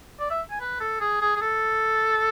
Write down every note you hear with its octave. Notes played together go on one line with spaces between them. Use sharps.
D5
E5
G#5
B4
A4
G#4
G#4
G#4
A4